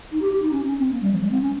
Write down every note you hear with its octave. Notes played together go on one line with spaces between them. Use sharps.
D#4
G4
G4
D#4
C#4
C#4
C4
A#3
G3
F3
G#3
C4
C#4